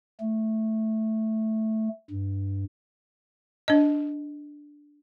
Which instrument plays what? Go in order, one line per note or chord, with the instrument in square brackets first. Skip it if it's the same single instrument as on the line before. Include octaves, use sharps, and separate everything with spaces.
[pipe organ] A3
G2
[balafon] D4 D#5